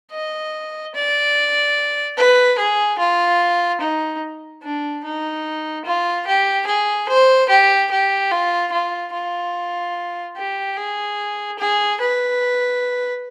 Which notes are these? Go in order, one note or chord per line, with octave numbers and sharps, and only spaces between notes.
D#5
D5
B4
G#4
F4
D#4
D4
D#4
F4
G4
G#4
C5
G4
G4
F4
F4
F4
G4
G#4
G#4
B4